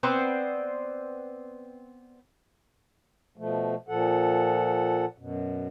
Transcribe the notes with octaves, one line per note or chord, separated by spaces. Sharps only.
B3 C4 C5 D5
B2 F3 A3
A#2 F3 A4 F#5
F#2 B2